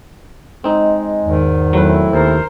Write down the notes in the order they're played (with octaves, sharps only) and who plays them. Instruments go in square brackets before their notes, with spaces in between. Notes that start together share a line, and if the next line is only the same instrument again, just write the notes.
[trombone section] G#3 [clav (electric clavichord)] C4 D#4
[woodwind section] E2 G#2 D#3
[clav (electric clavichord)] F#3 B4 [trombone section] A3 C4 E4
[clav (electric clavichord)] D#2 [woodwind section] A#4 C5